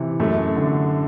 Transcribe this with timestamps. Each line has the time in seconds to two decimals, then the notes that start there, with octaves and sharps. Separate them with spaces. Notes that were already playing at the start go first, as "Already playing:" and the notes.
Already playing: C3 E3
0.20 F#2 A3
0.57 D3